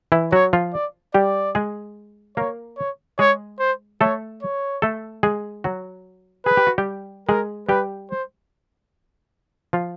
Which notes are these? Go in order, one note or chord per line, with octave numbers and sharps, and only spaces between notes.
E3 E4
F#3 F#4 C#5
F3 F4
D5
G3 G4 D5
G#3 G#4
A#3 A#4 C#5
C#5
G#3 G#4 C#5
C5
A3 A4 C#5
C#5
A3 A4
G#3 G#4
F#3 F#4
G#4 B4
G4
F#4
G3 G4
G#3 G#4 A#4
G3 G4 B4
C5
F3 F4